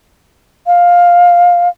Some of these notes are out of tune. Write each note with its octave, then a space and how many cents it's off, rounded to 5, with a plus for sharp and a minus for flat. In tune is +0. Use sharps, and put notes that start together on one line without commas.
F5 +10